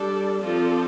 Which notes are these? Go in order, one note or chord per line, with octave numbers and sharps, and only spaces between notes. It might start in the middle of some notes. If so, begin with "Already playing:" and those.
Already playing: G3 D4 A4 D5
F3 C4 F4 A4 D5